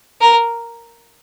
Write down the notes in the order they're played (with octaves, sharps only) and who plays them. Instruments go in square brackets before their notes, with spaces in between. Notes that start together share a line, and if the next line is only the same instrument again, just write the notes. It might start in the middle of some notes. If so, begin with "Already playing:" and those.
[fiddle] A#4